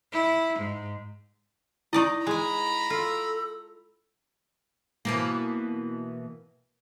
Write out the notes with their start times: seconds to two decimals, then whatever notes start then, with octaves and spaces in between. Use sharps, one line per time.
0.12 E4
0.59 G#2
1.93 D#4 E4 D5 D#5 C#6
2.27 G#3 G#5 A#5 B5
2.90 F4 A4
5.05 B2 E3 A#3